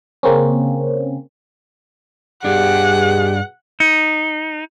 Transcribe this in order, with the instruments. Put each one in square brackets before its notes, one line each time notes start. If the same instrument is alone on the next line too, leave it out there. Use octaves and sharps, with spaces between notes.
[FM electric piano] C#3 A#3 C4 C#4
[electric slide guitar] G2 D4 [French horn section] B2 G#4 [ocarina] G4 [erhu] F#5
[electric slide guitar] D#4